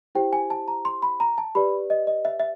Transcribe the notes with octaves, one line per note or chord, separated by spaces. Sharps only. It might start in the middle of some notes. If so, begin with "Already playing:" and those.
E4 G4 C5 G5
G#5
A5
A#5
C6
B5
A#5
A5
G4 B4 D5 B5
D#5
D#5
E5
E5